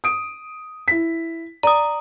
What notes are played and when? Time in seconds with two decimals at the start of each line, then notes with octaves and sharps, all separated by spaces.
0.04 D#6 D7
0.88 E4 B6
1.63 D5 A#5 D#6